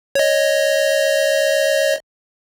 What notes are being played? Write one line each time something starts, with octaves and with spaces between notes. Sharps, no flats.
C#5 D#5